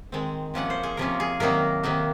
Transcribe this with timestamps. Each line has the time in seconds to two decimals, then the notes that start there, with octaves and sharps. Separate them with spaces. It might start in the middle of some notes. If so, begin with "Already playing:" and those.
0.12 D#3 G#3 C4
0.54 C3 F3 A#3 C#4 F#5
0.70 C5
0.83 G#4
0.97 C3 F3 A#3 C#4 A#4
1.20 G#4
1.40 C3 D#3 F#3 A#3 D#4 A#4
1.83 C3 D#3 F#3 A#3 D#4